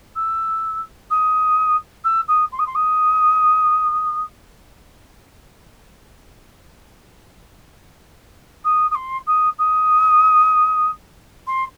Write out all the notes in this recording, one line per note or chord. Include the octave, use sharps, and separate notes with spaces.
E6
D#6
E6
D#6
C6
D#6
C6
D#6
D#6
D#6
C6
D#6
D#6
C6